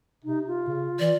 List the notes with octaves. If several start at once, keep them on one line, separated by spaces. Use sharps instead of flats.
C3 D#4
F4
C#3
E3 D5